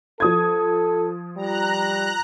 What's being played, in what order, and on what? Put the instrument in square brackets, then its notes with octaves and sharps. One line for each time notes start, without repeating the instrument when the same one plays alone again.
[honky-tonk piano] F3 D#6 G#6 [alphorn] A4
[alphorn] G3 [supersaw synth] A#5 F#6